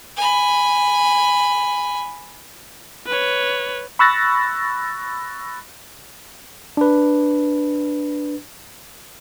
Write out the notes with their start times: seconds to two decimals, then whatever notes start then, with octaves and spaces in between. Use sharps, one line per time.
0.17 G#5 B5
3.07 B4 C#5
3.99 B5 C#6 E6 F#6 A6 A#6
6.77 D4 B4